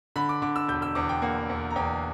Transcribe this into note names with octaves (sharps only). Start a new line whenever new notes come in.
D3 B5
D6
D3 D6
E6
E1 G6
E6
E2 D6
G5
A#3 F#5
E2
A#5
E2 G5